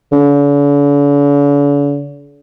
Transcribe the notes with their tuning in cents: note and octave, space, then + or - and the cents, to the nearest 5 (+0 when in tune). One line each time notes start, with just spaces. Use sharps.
D3 -45